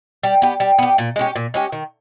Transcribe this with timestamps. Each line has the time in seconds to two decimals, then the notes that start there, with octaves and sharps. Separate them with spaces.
0.23 G3
0.42 B3 G4
0.60 G3
0.78 B3 G4
0.98 A#2
1.16 G#3 C#4 G4
1.36 A#2
1.54 G#3 C#4 G4
1.72 D#3